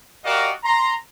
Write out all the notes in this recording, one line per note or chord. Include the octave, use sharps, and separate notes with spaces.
F#4 G4 A#4 D5 D#5 F5
A#5 C6